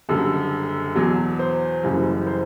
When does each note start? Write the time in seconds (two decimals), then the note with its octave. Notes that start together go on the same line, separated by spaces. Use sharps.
0.09 F#1 F#2 D3 G3 A4
0.96 E2 B2 F#3
1.39 C5
1.83 F#1 F#2 E3 G3
2.27 C5